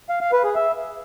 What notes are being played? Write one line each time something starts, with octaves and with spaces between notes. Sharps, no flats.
F5
F5
B4
G#4
E5